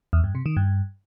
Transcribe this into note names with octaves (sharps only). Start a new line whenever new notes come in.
E2
G2
C3
D#3
G2